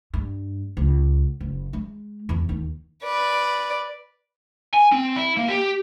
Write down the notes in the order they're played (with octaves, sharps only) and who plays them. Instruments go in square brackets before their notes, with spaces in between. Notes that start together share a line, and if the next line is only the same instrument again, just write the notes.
[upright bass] G2
C#2
F#1
G#3
E2
D#2
[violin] B4 D5
[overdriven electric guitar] G#5
C4
E4
A#3
G4